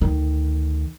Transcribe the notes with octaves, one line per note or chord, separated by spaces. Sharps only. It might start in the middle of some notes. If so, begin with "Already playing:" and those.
D2 D#3